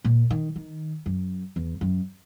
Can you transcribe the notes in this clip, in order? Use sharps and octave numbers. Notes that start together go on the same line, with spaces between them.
A#2
D#3
D#3
F#2
E2
F#2